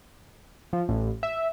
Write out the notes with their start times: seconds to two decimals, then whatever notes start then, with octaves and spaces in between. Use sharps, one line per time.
0.73 F3
0.89 A1
1.23 E5